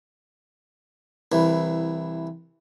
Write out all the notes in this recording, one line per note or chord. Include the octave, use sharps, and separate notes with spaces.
C2 E3